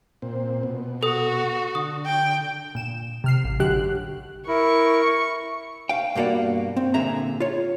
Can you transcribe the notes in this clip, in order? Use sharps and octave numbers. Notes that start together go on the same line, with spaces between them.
A#2 C4
B2
F#4 A4 D#6
D3 D#6
G5
A#2 E7
C3 F6 C7
A1
A#1 F#2 D3 F#4 G4 F#6
E4 A#4 C#6
F5 G5
G2 B2 A#3 F#4 D5
C4
A#2 D3 C4 G#4 E5 A#5
F4 C#5